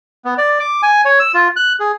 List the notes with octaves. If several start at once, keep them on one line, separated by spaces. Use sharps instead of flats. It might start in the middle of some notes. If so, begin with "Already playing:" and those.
B3
D5
D6
G#5
C#5
E6
F4
F#6
G#4